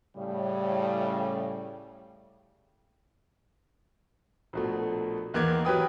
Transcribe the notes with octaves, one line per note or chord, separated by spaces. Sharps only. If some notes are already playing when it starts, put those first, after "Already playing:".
A2 C#3 G3
A#1 B2 A3
E2 D#3 E3 A#3 D6 G#6
E3 F#3 G4 B4 G5 D#6